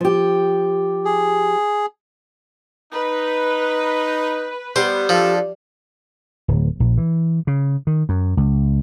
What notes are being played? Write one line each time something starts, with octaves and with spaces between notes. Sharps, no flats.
F3 G4
G#4
D#4 B4
G3 B3 C5
F3 D4 A4
D1
A#1
E3
C#3
D#3
F#2
C#2